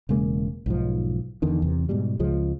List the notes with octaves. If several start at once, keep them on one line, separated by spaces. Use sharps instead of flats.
E1 C#3 G#3 A#3
B1 G#2 F3
E2 D3 D#3
E2 C3
G#2 B2 G3
C#2 F3 G#3